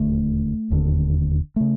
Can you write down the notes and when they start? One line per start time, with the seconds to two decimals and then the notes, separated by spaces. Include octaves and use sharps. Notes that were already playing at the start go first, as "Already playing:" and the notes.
Already playing: E1 D#2 D3 A3
0.70 E1 D#2 D3
1.56 C#3 A3